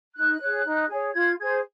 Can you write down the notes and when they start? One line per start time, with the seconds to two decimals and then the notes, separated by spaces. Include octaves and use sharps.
0.16 D#4 F#6
0.41 G#4 C#5
0.66 D#4
0.89 G#4 C#5
1.14 F4 G#6
1.39 G#4 C5 G#6